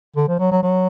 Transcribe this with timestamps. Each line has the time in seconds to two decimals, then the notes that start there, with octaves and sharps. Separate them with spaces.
0.16 D3
0.28 F3
0.39 F#3
0.52 F#3
0.63 F#3